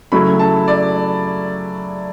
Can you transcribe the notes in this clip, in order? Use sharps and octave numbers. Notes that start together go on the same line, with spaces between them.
C#3 F#3 A3 C#4 E4 B5
A5
D5